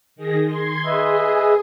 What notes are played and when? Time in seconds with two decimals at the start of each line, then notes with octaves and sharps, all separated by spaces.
0.16 D#3 G#4 A#6
0.46 C6 G#6
0.85 G#4 B4 D#5 E5